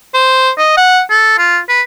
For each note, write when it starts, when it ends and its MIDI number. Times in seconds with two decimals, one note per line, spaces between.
0.14 0.50 72
0.58 0.75 75
0.77 1.01 78
1.10 1.37 69
1.38 1.59 65
1.69 1.81 71